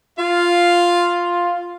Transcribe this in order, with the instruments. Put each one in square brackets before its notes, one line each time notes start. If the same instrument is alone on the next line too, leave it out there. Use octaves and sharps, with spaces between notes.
[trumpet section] F4 [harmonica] F5